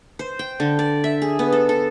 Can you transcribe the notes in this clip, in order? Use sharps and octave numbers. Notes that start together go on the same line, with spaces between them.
C5
G5
D3
D5
E5
G#4
B3
A4
A4